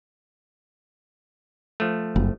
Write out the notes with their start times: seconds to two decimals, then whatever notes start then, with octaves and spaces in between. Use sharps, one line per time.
1.80 F3 A3
2.16 F#1